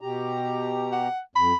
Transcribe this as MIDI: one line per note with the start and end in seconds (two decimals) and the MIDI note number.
0.01 1.08 47
0.01 1.08 67
0.01 1.08 82
0.92 1.19 78
1.36 1.53 41
1.36 1.57 83